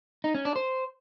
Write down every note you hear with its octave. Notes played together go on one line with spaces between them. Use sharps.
D#4
C#4
D4
C5